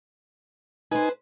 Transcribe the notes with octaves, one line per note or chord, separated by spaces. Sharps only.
D#4 B4 C5 G#5